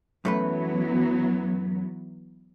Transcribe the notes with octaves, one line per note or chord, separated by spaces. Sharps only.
F#2 E3 F#3 A3 B3 B4